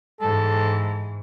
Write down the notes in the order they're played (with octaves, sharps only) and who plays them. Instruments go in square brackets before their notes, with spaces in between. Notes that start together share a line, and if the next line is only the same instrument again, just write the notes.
[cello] G#2 E3 [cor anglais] A4